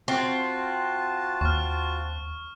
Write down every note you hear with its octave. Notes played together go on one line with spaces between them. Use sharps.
C4 F4 F#4 A5
D#2 C#6 F6